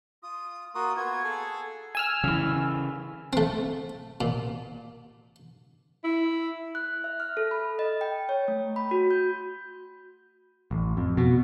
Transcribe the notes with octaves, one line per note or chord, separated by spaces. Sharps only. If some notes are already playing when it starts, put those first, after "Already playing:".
F4 D#6
A#3 F4 F#4 D#6
B3 F4 F#4 G#6
G#4 A4
G#5 E6 F6
C#3 E3
A3 C4
A#2
E4
F#6
E5
F6
A4
B5
D#5
G5
C#5
A3
B5
F#4
G6
A1
F2
B2